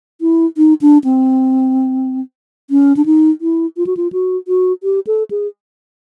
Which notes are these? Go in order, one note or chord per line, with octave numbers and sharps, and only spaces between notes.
E4
D#4
D4
C4
C#4
D4
D#4
E4
F4
F#4
F4
F#4
F#4
G4
A4
G#4